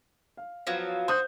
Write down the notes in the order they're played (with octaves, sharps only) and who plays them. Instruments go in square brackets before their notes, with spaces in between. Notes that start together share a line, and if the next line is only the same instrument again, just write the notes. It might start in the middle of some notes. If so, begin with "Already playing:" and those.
[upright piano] F5
[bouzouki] F3 F#3 B3
[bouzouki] F#4 [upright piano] C5 D#6 G6